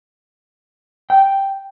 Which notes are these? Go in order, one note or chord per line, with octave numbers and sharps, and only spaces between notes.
G5